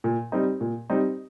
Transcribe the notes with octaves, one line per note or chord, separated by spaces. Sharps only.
A#2
G3 C4 D#4
A#2
G3 C4 D#4